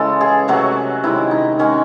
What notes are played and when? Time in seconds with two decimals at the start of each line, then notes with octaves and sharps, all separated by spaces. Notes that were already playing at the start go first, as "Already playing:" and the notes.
Already playing: C#3 E3 G#3 A4
0.21 G#4
0.48 C3 F#3 A3 F#4
1.04 C3 D#3 G#3 E4
1.31 D#4
1.59 D#3 G#3 C#4